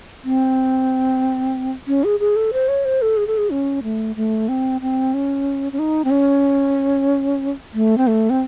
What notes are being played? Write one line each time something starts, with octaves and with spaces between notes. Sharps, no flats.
C4
C#4
G#4
G#4
A4
C5
C#5
C5
A4
G#4
A4
G#4
C#4
A3
A3
C4
C4
C#4
C#4
D#4
C4
C#4
A3
C4
A3
C4